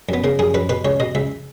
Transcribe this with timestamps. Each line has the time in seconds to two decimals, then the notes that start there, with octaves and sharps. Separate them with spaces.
0.09 F#2 B3
0.24 C#3 A#3
0.39 F#2 G#4
0.54 F#2 B4
0.69 B2 B4
0.85 C#2 C#5
1.00 B2 D#5
1.15 C#2 E5